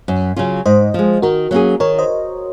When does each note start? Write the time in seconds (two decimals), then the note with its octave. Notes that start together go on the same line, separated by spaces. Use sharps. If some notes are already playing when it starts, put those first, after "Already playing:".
0.08 F#2
0.36 C#3 F#3 C#4 F4
0.66 G#2 C5 D#5
0.94 F3 G#3
1.22 D#3 F#4 A#4
1.51 F#3 A#3 C#4 G#4
1.80 D#3 A#4 C#5
1.99 C5 D#5